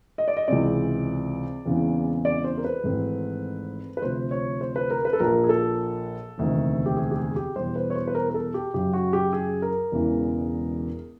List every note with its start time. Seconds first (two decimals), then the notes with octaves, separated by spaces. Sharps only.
0.18 D#5
0.28 D5
0.37 D#5
0.48 C#2 C3 E3 G#3 C4 D5
1.65 E2 C#3 E3 G#3 C4
2.25 D5
2.44 C5
2.58 A#4
2.64 B4
2.84 G#1 G#2 E3 A3 C4
3.97 B4
4.02 D2 C3 F3 C5
4.31 C#5
4.61 C5
4.76 B4
4.91 A#4
5.05 B4
5.13 A4
5.20 A#1 A#2 F3 A#3 A#4
5.44 G#4
5.49 A4
6.38 E1 D2 C3 D#3
6.86 G4
6.97 G#4
7.11 G4
7.16 G#4
7.36 G4
7.56 E2 B2 G3 C5
7.76 B4
7.90 C#5
7.96 C5
8.07 B4
8.15 A#4
8.30 A#4
8.34 A4
8.54 G4
8.74 F#2 C#3 F#3 G4
8.93 F#4
9.13 G4
9.33 G#4
9.62 A#4
9.92 E1 E2 C#3 E3 G#3